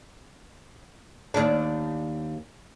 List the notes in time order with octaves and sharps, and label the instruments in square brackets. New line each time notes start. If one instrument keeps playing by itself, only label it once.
[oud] D#2 D4